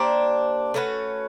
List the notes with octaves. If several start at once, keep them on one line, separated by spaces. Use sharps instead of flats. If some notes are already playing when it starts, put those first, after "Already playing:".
Already playing: A#3 D4 G4 C5
A3 C#4 F#4 B4